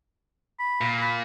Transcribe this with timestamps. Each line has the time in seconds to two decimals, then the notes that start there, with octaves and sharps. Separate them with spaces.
0.59 B5
0.81 A#2
1.01 B5